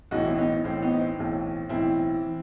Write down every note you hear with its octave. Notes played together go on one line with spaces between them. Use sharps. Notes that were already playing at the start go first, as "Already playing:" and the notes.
B1 A2 E3 D#4 F#4
C4 E4
B3 D#4
B1 A2 E3 C4
B3 D#4
D#4
C4
B1 A2 E3
B1 A2 E3 C4 E4
E3